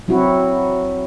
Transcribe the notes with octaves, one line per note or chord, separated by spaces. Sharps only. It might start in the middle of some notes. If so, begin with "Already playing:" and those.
F#3 C4 E4 F#4